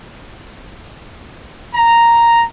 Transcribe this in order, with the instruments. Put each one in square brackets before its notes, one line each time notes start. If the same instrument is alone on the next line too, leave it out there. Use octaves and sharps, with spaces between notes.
[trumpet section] A#5